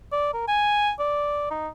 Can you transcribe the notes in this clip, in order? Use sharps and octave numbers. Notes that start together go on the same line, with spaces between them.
D5
A#4
G#5
D5
D#4